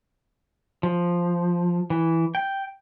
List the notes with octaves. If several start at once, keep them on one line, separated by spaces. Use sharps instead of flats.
F3
E3
G5